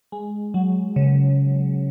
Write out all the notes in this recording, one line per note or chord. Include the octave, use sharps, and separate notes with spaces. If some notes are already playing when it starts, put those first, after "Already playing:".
G#3
F#3
C#3